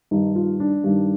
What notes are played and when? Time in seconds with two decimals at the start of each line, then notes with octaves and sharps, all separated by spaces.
0.11 G2 D#3 D#4
0.35 F4
0.60 D4
0.84 G2 D#3